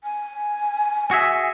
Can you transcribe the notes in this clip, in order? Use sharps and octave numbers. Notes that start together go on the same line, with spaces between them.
G#5
F#4 G#4 E5